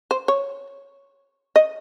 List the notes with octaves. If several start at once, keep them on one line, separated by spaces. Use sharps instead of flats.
C5
C#5
D#5